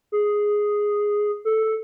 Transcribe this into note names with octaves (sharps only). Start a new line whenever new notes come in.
G#4
A4